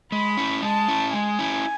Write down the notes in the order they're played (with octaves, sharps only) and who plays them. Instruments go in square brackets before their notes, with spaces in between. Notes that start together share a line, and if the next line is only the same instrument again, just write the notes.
[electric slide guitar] G#3 [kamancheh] B5
[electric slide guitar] C#4 E4
[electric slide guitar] G#3 [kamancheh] A5
[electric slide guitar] C#4 E4
[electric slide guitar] G#3 [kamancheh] G#5
[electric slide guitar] C#4 E4